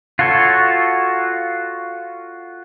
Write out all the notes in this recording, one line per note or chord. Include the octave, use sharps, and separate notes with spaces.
F4 F#4 A4 C#5